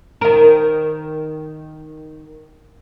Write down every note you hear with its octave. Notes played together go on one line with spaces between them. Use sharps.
D#3 A#4